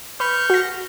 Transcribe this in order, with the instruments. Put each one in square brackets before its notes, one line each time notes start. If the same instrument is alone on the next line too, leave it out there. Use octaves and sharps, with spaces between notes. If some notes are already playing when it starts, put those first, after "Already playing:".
[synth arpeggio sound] B4 [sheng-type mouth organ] C#6 F6 G6
[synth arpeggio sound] F#4 A#6